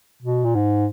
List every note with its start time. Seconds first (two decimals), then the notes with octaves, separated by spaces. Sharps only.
0.22 B2
0.44 A#2
0.55 G#2